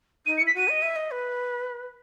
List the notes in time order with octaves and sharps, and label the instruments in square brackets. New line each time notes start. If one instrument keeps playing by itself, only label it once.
[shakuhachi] D#4 [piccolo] D#7
[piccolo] C#7
[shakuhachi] E4
[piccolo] B6
[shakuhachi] F#4 [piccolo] D#7
[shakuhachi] D#5
E5
D#5
B4